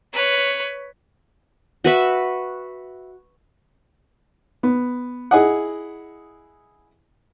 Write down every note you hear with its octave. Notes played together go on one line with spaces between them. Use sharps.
B4 C#5
F#4 B4 E5
B3
E4 G#4 D#5 F#5